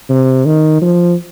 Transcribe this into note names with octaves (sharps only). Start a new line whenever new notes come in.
C3
D#3
F3